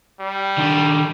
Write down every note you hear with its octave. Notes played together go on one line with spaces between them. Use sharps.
G3
D#3 D4